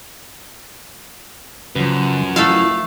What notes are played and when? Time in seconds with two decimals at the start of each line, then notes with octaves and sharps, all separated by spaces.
1.75 F#2 C#3 F3 F#3 B4
2.36 A3 E4 F4 A4 F5